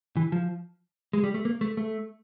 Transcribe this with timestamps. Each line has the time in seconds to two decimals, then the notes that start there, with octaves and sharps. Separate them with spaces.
0.17 E3
0.32 F3
1.13 G#3
1.24 G3
1.34 A3
1.45 A#3
1.61 A3
1.77 A3